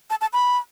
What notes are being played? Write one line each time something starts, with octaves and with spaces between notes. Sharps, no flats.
A5
A5
B5